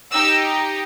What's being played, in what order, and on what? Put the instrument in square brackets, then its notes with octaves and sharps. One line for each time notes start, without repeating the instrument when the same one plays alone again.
[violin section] D#4 G4 E6